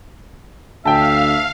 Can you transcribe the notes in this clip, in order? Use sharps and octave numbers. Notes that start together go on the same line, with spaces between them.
D2 E5 F5 G5 A5